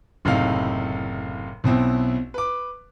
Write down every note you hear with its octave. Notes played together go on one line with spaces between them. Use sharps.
F#1 A2 C3 D#4 F5
B1 B2 C4 E4
B4 D6